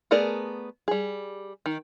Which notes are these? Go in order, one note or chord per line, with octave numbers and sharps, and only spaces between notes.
A3 B3 G#4 A#4 D5
G3 G#4
D#3